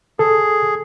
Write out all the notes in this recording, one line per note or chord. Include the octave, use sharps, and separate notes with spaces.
G#4 A4